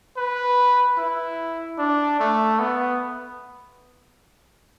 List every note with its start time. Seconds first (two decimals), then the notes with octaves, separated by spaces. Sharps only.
0.17 B4
0.98 E4
1.78 D4
2.20 A3
2.59 B3